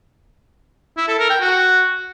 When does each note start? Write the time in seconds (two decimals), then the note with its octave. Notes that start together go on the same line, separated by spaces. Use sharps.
0.97 E4
1.08 A4
1.19 A#4
1.30 G5
1.41 F#4